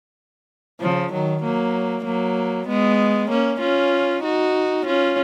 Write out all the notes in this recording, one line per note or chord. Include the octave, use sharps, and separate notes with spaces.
C#3 F3
D#3 F#3
F#3 A#3
F#3 A#3
G#3 B3
A#3 C#4
C#4 F4
D#4 F#4
C#4 F4